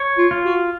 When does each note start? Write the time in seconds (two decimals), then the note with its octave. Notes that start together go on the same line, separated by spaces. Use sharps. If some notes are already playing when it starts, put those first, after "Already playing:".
Already playing: C#5
0.18 F4
0.31 F4
0.45 F#4